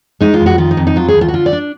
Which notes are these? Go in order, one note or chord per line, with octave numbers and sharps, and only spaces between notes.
G#3 D#4
F4
F2
F#4
D#3 F4
D#4
F2
D#4
F#3 F4
G#4
D#2
F4
F#4
D3 F4
D5
D4